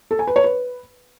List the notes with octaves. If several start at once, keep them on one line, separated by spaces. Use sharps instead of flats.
A4
G#5
B4
C#5
B4